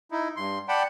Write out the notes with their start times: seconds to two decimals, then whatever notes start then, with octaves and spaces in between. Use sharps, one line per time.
0.11 D#4 E4
0.37 G2 C6
0.68 D5 F#5 G5 A5 B5